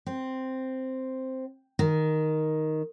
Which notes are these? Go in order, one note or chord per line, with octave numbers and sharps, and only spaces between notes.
C4
D#3